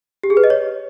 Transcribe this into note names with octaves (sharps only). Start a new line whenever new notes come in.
G4
G#4
B4
D#5
C#5